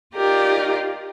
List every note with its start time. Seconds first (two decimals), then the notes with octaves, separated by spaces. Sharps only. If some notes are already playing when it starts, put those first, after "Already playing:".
0.14 D#4 F4 G4 A#4 D5